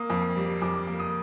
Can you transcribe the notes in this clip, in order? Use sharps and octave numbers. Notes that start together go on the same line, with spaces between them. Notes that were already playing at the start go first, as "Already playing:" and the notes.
Already playing: A#3 D#6
F2
G3
F2 D6
A#3
D#6